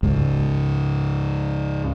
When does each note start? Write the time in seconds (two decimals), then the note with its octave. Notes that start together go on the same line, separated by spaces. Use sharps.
0.03 C#2 G#2